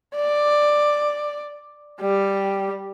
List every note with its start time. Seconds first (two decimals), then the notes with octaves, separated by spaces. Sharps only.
0.16 D5
2.01 G3